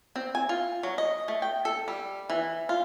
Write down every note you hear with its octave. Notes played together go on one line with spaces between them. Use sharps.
C4
G#5
F4
F#3
D#5
A3
G5
A4
G3
E3
F4